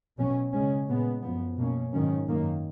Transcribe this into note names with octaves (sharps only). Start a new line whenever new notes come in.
B2 F#3 C#4
C#3 G#3 C#4
A#2 G#3 B3
F#2 F3 B3
B2 A#3 C#4
G#2 D#3 F#3 C#4
F#2 D#3 A#3